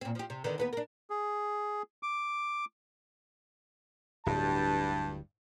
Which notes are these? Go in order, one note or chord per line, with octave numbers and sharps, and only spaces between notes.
A#2 C4
F3 G4
C3
D3 D#3 B3
D#2 B3 B4
D4 A#4
G#4
D6
D1 G2 A5